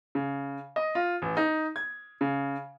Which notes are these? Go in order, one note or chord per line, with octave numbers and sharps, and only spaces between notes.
C#3
D#5
F4
A1
D#4
G#6
C#3